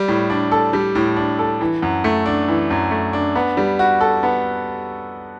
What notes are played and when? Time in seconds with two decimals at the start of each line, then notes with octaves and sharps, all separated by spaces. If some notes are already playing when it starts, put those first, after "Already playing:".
Already playing: G3
0.08 A2
0.30 D4
0.51 A4
0.73 G3
0.95 A2
1.16 D4
1.39 A4
1.61 E3
1.82 F#2
2.04 A3
2.26 D4
2.48 E3
2.70 F#2
2.91 A3
3.13 D4
3.36 B3
3.57 G3
3.79 F#4
4.01 A4
4.23 B3